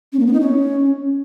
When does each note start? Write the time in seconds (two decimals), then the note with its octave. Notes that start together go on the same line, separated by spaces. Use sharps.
0.13 C#4
0.20 A#3
0.27 B3
0.33 D#4
0.40 C#4